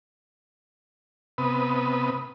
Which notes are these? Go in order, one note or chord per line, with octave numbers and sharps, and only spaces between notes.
C3 B3 B4 D#6